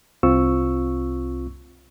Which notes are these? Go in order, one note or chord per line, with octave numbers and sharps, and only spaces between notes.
C2 C4 F4 C#6 E6